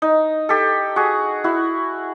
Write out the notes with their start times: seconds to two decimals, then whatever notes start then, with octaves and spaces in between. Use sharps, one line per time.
0.02 D#4
0.49 G4 A4
0.96 F#4 G#4
1.44 E4 F#4